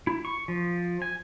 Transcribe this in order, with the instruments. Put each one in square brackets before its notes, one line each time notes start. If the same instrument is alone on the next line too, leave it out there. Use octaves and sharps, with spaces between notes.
[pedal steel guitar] E4
C#6
F3
G#5